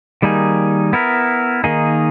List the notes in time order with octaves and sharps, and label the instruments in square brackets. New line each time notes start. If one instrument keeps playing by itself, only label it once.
[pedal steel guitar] D#3 G3 A#3 D#4 G#4
B3 E4 A#4
D#3 A#3 D#4 G#4